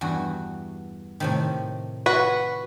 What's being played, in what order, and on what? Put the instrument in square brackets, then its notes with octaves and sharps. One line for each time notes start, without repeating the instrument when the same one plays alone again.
[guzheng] E2 G2 F#4
A2 C3 D#3
[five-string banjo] F#4 B4